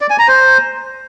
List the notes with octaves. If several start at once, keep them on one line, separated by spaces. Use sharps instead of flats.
D5
G#5
A#5
C5